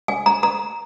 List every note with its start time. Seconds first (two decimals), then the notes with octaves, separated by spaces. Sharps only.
0.08 G#5
0.26 A#5
0.43 A#5